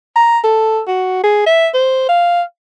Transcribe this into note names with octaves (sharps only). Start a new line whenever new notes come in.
A#5
A4
F#4
G#4
E5
C5
F5